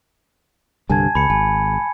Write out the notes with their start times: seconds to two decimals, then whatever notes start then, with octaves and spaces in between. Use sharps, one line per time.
0.90 C2 G2 D3 G#5 A5 G#6
1.15 C#2 B5 C#7
1.30 G#1 G#5